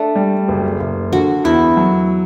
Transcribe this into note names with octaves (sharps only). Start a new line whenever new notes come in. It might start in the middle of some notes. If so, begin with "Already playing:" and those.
Already playing: A3 D4
G3
F#1
F#1
D3 F#4
E2 E4
F#3